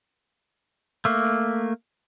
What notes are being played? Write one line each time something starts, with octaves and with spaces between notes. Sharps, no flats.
A3 A#3